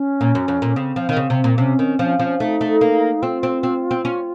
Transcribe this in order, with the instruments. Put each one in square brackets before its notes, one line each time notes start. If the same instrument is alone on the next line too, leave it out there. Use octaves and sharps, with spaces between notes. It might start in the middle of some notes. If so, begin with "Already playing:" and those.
Already playing: [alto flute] C#4
[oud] A#2
F#2
F2
A#2
[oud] C#3 [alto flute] C4
[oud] F3
D#3
C#3
C3
A#2
[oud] C3 [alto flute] C#4
[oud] D#3
F3
F3
[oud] A3 [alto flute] D#4
[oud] A3
A#3
[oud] C4 [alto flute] F4
[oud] C4
C4
C4
C#4